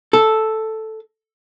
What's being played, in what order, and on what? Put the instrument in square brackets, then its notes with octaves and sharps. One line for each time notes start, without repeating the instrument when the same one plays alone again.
[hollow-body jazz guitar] A4